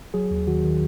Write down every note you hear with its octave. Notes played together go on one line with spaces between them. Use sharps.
F#3 G#4
D#2
D#3 F#4
D#3